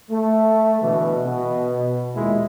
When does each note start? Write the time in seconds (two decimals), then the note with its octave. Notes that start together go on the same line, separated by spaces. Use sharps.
0.10 A3
0.81 B2 D3 E3
1.25 B2
2.15 D#2 A#2 G#3 E4